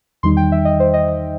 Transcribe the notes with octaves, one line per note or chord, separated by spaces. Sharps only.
E2 D#3 G3 D#4 C6
G5
E5
D#5
C5
D#5
D#5